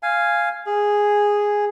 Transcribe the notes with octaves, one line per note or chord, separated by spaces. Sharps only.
F5 G#5
G#4